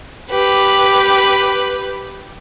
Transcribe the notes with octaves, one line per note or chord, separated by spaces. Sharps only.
G4 B4